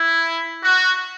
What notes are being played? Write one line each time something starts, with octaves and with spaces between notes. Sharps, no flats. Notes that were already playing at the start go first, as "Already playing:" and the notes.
Already playing: E4
F#4